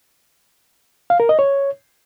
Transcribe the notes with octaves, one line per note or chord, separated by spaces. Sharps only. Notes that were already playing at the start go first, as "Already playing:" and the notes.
F5
A#4
D#5
C#5